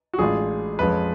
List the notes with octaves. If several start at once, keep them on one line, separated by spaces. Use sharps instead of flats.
F#4
A1 A2 G#3 D4 F4 G#4
F2 F3 G#3 C#4 B4